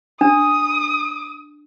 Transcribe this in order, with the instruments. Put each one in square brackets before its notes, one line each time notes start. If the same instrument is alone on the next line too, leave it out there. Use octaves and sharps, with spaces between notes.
[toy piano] D4 [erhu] D#6